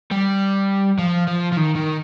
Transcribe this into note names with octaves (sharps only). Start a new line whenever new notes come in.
G3
F3
F3
F3
D#3
D#3